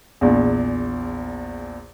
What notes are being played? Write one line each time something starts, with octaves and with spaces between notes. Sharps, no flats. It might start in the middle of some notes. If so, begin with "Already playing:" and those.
A#1 E2